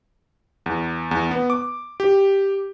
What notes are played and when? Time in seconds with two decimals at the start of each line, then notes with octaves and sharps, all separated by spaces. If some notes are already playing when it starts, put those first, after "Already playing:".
0.66 E2
1.11 E2
1.31 B3
1.50 D6
2.00 G4